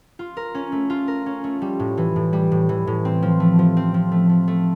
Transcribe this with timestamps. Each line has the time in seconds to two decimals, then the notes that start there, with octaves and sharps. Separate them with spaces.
0.19 F4
0.37 A#4
0.55 C#4
0.72 A3
0.90 F4
1.08 A#4
1.26 C#4
1.44 A3
1.62 G3
1.80 A2
1.98 E3
2.16 A2
2.33 G3
2.52 A2
2.69 E3
2.87 A2
3.05 C4
3.23 F3
3.40 A3
3.59 F3
3.77 C4
3.94 F3
4.12 A3
4.29 F3
4.48 A3